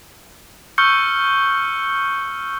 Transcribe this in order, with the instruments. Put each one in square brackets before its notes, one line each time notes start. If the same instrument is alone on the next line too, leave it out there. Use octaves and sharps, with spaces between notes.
[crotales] C#6 E6 F6 G6 C#7 G7